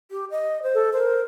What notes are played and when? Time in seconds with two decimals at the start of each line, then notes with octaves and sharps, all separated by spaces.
0.11 G4
0.31 D#5
0.63 C5
0.74 A4
0.93 A#4 C5